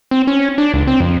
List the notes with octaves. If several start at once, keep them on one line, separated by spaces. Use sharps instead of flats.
C4
C#4
D4
C#2
C4
F2